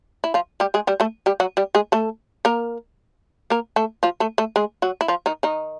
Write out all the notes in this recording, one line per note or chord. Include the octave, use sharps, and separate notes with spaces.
E4
F3 F4
G3 G4
G#3 G#4
G3 G4
A3 A4
G3 G4
F#3 F#4
G3 G4
G#3 G#4
A3 A4
A#3 A#4
A#3 A#4
A3 A4
F3 F4
A3 A4
A3 A4
G#3 G#4
F#3 F#4
E4
F3 F4
D#3 D#4
D#3 D#4